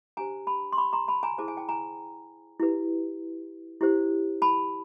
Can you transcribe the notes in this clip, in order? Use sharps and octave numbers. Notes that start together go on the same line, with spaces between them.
D4 G4 C5 G#5 A#5
A5 B5
C6
B5 C#6
A#5 C6
A5 B5
G#5 A#5
E4 G#4 C5 A5
G#5
G5 A5
G#5 A#5
E4 G4 B4
E4 G4 C5
A5 B5